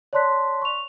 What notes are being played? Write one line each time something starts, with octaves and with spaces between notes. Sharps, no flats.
C#5 D5 A5 C6 F#6 B6
C#6 F7